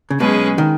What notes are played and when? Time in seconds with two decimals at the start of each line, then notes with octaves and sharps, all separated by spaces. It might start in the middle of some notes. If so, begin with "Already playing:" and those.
0.11 C#3
0.20 B1 B2 G#3 C#4 G#4 B4
0.58 D#3